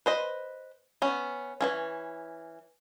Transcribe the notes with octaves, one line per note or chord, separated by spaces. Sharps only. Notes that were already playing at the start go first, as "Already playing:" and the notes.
B4 C5 D#5
B3 C#4
E3 F#3 C#4